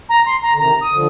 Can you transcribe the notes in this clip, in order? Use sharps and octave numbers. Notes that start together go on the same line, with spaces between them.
A#5
C6
A#5
D3
C3 D#3 A#5
D#6
D3 F3